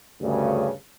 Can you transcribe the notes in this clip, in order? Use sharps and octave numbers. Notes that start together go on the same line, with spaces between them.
D2 G2 C#3